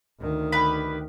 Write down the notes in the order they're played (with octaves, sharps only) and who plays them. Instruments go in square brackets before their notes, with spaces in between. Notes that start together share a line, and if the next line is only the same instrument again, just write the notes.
[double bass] D2 D#3
[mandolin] G4 B4 B5